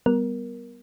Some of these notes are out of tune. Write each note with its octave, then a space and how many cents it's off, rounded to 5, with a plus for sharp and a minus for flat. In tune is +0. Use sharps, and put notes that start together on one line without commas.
G3 +0 B3 +0 A#4 +10